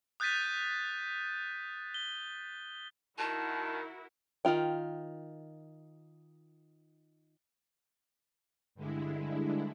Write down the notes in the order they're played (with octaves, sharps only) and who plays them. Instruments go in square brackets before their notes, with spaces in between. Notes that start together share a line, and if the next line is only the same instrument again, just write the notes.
[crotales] D#6 F#6 G6 A6 B6 D#7
G7
[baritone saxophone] D#3 [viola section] E4 F#4 A#4 [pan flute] A5
[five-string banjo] D#3 E4 F4 G5
[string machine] G2 D3 G#3 E4